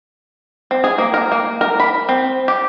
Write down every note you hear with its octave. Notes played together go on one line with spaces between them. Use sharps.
C4
G#4
A#3
A#4
A#3
A#4
B5
C4
G4